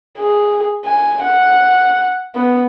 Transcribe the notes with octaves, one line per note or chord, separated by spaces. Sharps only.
G#4
G#5
F#5
B3